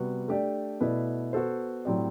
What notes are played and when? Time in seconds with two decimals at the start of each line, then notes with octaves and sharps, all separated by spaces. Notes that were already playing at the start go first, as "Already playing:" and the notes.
Already playing: C3 G3 B3 F#4 B4
0.28 A3 D4 G4 D5
0.81 B2 A3 E4 B4 D5
1.33 B3 F#4 A4 C5
1.85 A2 F#3 C4 G4 D5